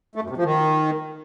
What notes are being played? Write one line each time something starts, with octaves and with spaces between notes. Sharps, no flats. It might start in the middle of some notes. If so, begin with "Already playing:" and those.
A3
F#2
C3
F3
D#3